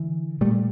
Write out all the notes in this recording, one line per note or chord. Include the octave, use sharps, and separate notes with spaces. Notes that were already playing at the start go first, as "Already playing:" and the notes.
Already playing: D3 E3
A#2 G3 A3